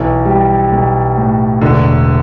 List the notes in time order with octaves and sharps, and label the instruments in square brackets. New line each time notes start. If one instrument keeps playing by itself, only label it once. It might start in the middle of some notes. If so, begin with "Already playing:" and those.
Already playing: [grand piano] B1 [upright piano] E3
[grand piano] G3
B1
A2
[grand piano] E1 [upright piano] D3